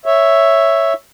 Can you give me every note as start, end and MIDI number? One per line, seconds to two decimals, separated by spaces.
0.06 0.93 73
0.06 0.93 76